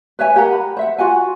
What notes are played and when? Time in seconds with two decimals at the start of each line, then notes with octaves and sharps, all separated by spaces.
0.19 B4 C#5 E5 G#5
0.36 G4 A#4 F#5 A#5
0.52 B5
0.77 C5 E5 F#5
0.98 F4 F#4 F#5 G#5